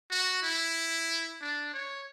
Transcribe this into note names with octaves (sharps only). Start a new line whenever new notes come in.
F#4
E4
D4
C#5